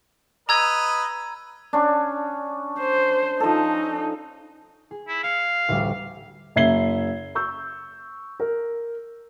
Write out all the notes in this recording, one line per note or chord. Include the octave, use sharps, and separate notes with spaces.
B4 D#5 A#5 E6 G#6
C#4 D4
C5
F3 D#4 A4
G#4
E4
F5 G#6 C#7
A1 D2 G3
F#1 E5 G#6 C7 G7
C#6 E6 G6
A#4